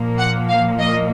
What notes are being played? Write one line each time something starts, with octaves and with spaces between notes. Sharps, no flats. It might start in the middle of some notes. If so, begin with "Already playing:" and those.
Already playing: A#2 F3 A#3
F#5
F5
D#5